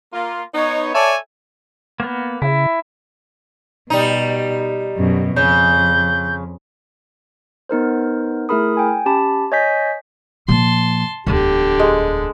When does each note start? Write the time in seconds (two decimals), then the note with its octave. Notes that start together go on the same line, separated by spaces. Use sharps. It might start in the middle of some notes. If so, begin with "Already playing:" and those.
0.13 A#3 F4
0.54 B3 D#4 C#5
0.94 A4 C#5 D5 E5 G#5 A5
2.00 A#3 B3
2.42 C#3 E4
3.90 B2 G3 D#4
4.97 F#2 B2
5.36 F2 C#3 G6
7.69 B3 D#4 A#4 C5
8.49 A3 E4 G#4 A#4 B5 D#6
8.77 G5 G#5
9.06 C#4 G4 A5 B5
9.52 C#5 D#5 G#5 G6 B6
10.48 A#2 F3 A5 C6
11.27 D1 E2 D3 G4
11.80 G#3